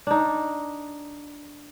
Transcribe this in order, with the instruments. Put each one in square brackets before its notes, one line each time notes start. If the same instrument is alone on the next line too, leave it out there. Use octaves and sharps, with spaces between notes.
[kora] D4 D#4